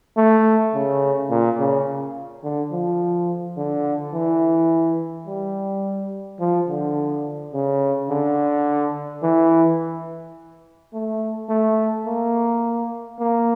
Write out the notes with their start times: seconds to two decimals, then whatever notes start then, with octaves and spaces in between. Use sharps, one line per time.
0.17 A3
0.74 C#3
1.30 A#2
1.59 C#3
2.43 D3
2.72 F3
3.57 D3
4.14 E3
5.27 G3
6.40 F3
6.68 D3
7.53 C#3
8.10 D3
9.23 E3
10.93 A3
11.49 A3
12.06 A#3
13.20 A#3